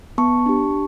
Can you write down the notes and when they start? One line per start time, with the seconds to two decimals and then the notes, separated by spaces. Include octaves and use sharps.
0.18 B3 A5 C#6
0.46 D4 G4